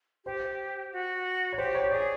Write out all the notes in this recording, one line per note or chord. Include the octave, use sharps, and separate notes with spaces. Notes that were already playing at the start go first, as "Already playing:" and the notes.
G4 C5
F#4
C#5
G4 C5
C#5
G#4 D5